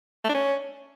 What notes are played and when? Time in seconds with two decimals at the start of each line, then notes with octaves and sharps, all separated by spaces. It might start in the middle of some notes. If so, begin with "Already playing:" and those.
0.25 A3
0.30 D4
0.35 C#4